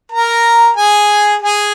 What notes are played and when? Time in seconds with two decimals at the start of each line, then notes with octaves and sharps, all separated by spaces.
0.12 A#4 A#5
0.77 G#4 G#5
1.42 G#4 G#5